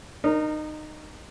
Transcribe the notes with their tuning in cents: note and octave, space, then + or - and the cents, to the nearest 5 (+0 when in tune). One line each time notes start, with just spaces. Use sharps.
D#4 -25 A#4 +0